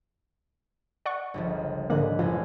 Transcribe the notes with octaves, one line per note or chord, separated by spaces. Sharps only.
D5 F#5 C#6
G1 C#2 F3
C2 G#2 D3 A#3 F#6
A1 F#2 F3